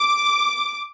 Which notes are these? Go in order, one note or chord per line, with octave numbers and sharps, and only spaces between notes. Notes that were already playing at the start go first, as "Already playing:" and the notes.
Already playing: D6